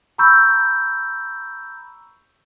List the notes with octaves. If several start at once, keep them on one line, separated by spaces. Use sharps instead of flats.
A#5 B5 C#6 E6 G6